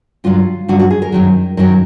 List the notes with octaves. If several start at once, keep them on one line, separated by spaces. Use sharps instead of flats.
G2 D3 F#3 F4
G2 D3 F#3 F#4
F#4
G#4
A#4
F#2 D#3 F#3
F#2 D#3 F#3 A#4